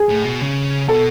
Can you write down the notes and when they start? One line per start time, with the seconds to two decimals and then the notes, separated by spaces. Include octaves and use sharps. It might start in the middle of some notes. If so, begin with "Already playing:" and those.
Already playing: G#4
0.09 A2
0.24 B2
0.41 C#3
0.88 B2 A4